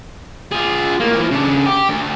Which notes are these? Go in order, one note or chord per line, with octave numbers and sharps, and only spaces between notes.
F4 G#4
A2 A#3
E3 F3
C#3 D4
G4
D2